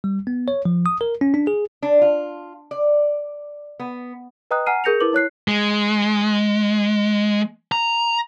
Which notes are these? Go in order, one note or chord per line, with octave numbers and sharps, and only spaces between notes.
G3
B3
C#5
F3
D#6
A#4
C#4
D4
G#4
D4
F4
D5
B3
B4 D#5 G5 A#5 D#6 F#6
F#5 G#5 A#5 F6 C7 D#7
G#4 A#4 G6 A#6 C#7 F7
E4 A#4 B4 D6 F#7
E4 C#5 F#6 C7
G#3
A#5